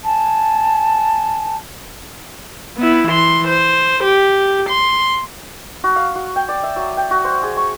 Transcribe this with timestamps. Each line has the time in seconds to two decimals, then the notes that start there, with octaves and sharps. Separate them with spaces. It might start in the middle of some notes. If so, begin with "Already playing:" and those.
0.04 G#5 A5
2.77 B3 E4
3.08 E3 C6
3.48 C5
4.03 G4
4.69 C6
5.84 F#4
5.96 F5
6.15 F#4
6.36 G5
6.49 D5
6.63 E5
6.76 F#3
6.97 G5
7.11 F#4
7.24 C5
7.43 G#4
7.57 C#6